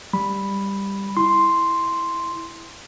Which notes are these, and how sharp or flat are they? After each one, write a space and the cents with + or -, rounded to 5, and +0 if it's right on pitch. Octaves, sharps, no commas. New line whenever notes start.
G3 +10 B5 +0
E4 +0 C6 +0